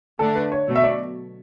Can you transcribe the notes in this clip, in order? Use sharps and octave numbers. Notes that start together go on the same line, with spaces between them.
D3 A3 D4 A4
B4
C#5
B2 F#3 A3
E5
D5